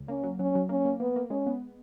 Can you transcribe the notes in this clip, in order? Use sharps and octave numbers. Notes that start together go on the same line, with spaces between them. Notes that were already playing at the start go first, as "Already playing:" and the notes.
Already playing: C#2
A#3 C#4
F#3
F#3 C#4
F#3
A#3 C#4
A#3
A#3 B3
A#3
G#3 C#4
B3